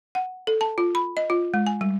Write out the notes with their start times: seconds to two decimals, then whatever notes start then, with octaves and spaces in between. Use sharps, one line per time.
0.15 F#5
0.47 A4
0.61 A5
0.78 F4
0.95 B5
1.17 D#5
1.30 F4
1.54 G#3
1.67 G#5
1.81 G3